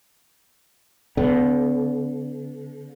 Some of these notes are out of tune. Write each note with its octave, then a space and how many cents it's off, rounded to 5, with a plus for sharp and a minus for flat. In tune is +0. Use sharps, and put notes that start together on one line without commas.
D3 -35 B3 +25